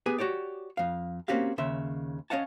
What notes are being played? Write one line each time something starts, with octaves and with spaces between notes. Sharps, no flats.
B3 G4 G#4 B4 G#5
F#4 G4 C#5 D5
F2 F5
A#3 C4 C#4 F#4 G4 F5
D#2 C#3 E5 C6
C#4 C#5 D#5 F5 F#5 A5